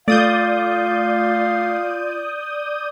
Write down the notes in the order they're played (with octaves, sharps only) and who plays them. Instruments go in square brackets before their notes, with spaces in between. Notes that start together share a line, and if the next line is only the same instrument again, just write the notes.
[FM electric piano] A3 A6 [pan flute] F4 [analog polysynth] D5 D#6 G6 [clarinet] F5